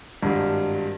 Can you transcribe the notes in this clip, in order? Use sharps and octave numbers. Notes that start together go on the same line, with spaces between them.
G#1 G2